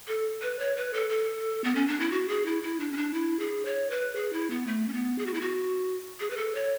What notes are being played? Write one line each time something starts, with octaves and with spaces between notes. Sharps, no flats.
A4
B4
C#5
B4
A4
A4
B3
C#4
D4
E4
F#4
G#4
E4
E4
D4
C#4
D4
E4
G#4
C#5
B4
G#4
E4
B3
A3
C#4
B3
G#4
F#4
E4
F#4
G#4
B4
A4
C#5